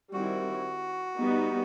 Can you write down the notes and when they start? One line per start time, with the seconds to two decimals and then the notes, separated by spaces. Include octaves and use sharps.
0.13 D#3 G3 C4 E4 F#4
1.20 G3 B3 D#4